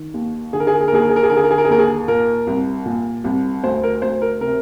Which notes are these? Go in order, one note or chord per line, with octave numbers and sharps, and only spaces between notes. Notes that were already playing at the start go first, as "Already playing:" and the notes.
Already playing: D#3
D#2
D3 G#4
A#4
G#4
A#4
G#4
A#4
D#2 G#4
A#4
G#4
A#4
G#4
D3 A#4
G#4
A#4
G#4
A#4
G#4
D#2 A#4
G#4
A#2 A#4
C2
A#2
C2
D2 C5
A#4
D2 C5
A#4
C3 A#4